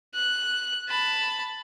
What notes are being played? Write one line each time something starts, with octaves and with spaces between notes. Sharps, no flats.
F#6
A5 B5